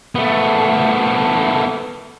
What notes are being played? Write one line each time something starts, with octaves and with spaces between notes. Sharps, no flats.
A3 B3